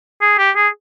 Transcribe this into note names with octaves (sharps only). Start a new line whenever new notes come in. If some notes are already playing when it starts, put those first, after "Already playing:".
G#4
G4
G#4